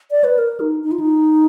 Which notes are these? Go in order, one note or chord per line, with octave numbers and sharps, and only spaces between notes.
D5
B4
A#4
D#4
D#4
F4
D#4